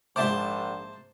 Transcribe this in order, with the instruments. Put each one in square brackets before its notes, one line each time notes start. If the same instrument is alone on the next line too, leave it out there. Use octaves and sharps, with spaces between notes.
[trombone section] A#1 [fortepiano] G#2 E5 D6 [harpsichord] C5 A5 C6